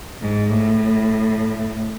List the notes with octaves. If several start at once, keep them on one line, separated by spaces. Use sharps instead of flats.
G#2
A2